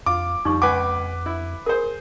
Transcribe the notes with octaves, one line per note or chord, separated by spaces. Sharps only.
F2 F4 D6
F2 F3 G3 D#4 C#6
C#2 B4 F#5 G#5 C#6 D6
E4
G#4 A#4 C5